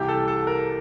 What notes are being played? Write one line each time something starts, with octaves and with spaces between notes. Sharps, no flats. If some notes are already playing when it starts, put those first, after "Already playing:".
Already playing: C2 C3 E3 G4
A4
A4
A#4